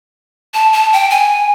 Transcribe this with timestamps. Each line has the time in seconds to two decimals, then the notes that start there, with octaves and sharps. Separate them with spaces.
0.54 A5
0.73 A5
0.93 G5
1.10 G#5